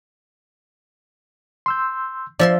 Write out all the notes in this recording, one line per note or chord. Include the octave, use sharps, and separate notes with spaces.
C6 E6 G6
F3 D5 E5 C6